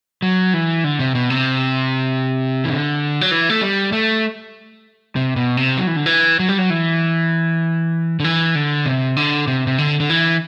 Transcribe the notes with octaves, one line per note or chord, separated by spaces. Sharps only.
F#3
E3
D3
C3
B2
C3
E3
D3
F#3
E3
A3
G3
A3
C3
B2
C3
F#3
E3
D3
E3
F#3
G3
F#3
E3
D3
E3
D3
C3
D3
C3
C3
D3
D3
E3